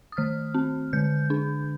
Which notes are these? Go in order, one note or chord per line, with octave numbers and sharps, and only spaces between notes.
D#6
D#3 F6
C4
D3 G6
D4